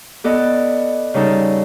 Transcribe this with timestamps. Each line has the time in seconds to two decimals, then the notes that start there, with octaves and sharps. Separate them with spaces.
0.24 B3 A4 D5 D#5
1.14 C#3 G3 D#4 A4